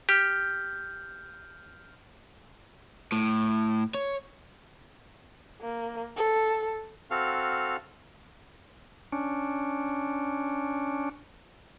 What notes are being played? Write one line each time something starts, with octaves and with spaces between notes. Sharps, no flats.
G4 F6 G6
A2
C#5
A#3
A4
C4 F#4 A4 F5 F6
C#4 D4